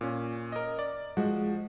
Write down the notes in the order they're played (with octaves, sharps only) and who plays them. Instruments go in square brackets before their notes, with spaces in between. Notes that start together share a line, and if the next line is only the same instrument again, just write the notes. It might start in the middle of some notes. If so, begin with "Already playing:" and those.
[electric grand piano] A#2 C#4
A#4 D#5
D5
[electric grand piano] F3 F#4 [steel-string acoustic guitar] G#3